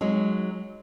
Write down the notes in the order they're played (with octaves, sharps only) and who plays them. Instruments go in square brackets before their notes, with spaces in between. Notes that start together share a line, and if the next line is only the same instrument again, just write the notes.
[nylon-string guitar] F#3 G#3 D#4